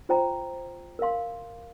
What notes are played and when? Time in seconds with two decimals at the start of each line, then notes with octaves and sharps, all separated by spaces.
0.09 F4 C5 G5 A#5
0.99 A#4 F5 C6